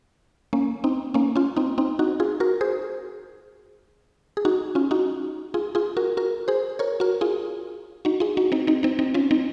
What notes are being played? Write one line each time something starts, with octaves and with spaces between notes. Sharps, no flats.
A#3 C#4
C4 D#4
A#3 C#4
C#4 F4
C4 D#4
C4 D#4
D#4 F#4
F4 G#4
F#4 A#4
G#4 C5
G#4
D#4 F#4
C#4 F4
D#4 F#4
F4 G#4
F4 G#4
F#4 A#4
F#4 A#4
G#4 C5
A#4 C#5
F#4 A#4
F4 G#4
D#4 F#4
F4 G#4
D#4 F#4
C4 D#4
C4 D#4
C4 D#4
C4 D#4
C#4 F4
C4 D#4